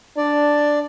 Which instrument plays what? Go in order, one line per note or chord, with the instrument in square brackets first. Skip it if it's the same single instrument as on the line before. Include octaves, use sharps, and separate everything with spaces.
[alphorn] D4 [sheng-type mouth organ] D5